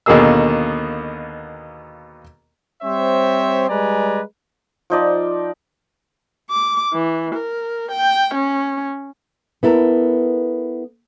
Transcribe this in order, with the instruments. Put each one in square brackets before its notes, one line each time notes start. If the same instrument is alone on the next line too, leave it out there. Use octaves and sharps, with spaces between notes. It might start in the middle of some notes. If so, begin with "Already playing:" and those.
[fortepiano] D#2 B2 D3 A#3 G#4 E6
[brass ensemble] G3 C4 C5 C#5 E5
G3 G#3 B4 D5 G#5 A#5
[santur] F3 D#4 D5
[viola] D6
E3
A#4
G5
C#4
[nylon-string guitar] B3 E4 A4 A#4